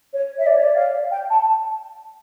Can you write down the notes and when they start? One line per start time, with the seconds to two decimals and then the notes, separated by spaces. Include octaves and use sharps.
0.14 C#5
0.39 E5
0.46 D5
0.55 C#5
0.64 D5
0.75 F5
1.11 G5
1.30 A5